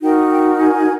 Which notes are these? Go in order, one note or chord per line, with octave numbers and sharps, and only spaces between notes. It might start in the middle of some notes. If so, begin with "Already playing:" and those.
D#4 F#4 A#4 G5
G5
G#5